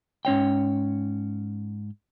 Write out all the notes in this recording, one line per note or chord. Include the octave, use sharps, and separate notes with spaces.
G#2 C#4 C#5 G5